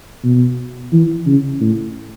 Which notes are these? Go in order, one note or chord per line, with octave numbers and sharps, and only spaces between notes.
B2
E3
C#3
A2